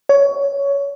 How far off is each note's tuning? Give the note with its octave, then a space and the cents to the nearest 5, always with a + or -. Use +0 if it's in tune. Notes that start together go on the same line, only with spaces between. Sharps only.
C#5 +15